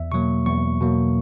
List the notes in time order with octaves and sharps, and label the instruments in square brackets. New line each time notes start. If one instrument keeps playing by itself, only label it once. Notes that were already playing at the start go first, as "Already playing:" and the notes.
Already playing: [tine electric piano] E2 E5
B2 F#3 A#3 C#6
E2 C#6
B2 F#3 A#3